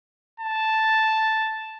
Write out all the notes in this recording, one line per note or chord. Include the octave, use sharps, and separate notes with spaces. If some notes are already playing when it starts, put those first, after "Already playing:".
A5